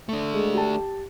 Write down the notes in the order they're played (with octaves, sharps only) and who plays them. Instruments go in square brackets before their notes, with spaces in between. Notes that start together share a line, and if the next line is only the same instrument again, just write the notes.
[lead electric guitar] A3 D4
[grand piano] G#3 G#4
G4 A5